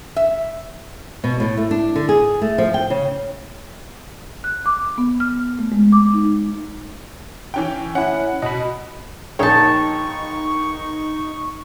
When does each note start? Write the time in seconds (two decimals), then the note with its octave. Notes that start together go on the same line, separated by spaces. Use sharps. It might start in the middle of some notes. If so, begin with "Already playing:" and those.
0.16 E5
1.24 B2
1.40 A2
1.57 A3
1.71 D4
1.95 D3
2.09 G#4
2.42 A3
2.58 F3
2.74 G5
2.90 C#3
4.44 F#6
4.66 D6
4.98 B3
5.20 F6
5.59 A3
5.72 G#3
5.92 D6
6.14 D#4
7.54 E3 C#4 G5
7.95 C#4 E4 F#5
8.42 B2 D#5 B5
9.39 A#1 D#4 G#4 C#5 G5 A5 C#6